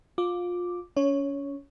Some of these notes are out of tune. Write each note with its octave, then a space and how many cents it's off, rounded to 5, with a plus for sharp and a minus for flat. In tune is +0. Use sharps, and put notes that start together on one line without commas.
F4 +20 D6 +0
C#4 +30 C#5 +0